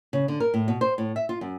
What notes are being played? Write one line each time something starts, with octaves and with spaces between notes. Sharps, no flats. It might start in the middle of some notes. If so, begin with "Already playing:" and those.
C#3
D3
A#4
A2
B2
C5
A2
E5
F4
F#2